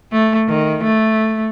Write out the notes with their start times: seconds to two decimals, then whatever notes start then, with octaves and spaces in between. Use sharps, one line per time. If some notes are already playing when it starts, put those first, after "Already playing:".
0.12 A3
0.48 D#3
0.84 A3